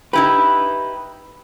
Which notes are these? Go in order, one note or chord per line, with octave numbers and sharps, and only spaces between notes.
D#4 E4 G4 B4